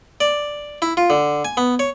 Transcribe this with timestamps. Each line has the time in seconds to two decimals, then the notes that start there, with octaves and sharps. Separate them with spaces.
0.21 D5
0.82 E4
0.97 F4
1.10 D3
1.45 G#5
1.57 B3
1.79 C#5